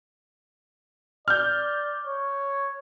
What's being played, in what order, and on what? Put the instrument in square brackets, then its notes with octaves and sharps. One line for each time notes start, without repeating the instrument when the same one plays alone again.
[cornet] D5 [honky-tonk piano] F6 G6
[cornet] C#5